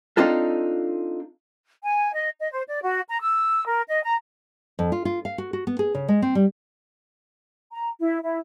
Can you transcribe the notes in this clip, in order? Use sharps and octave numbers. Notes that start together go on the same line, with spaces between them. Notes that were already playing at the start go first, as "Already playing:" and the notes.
C4 D4 D#4 F4 A4
G#5
D#5
D#5
C5
D5
F#4
A#5
E6
A#4
D#5
A#5
F2
F4
F4
F5
F#4
F#4
B3
G#4
C#3
G#3
C4
G3
A#5
E4
E4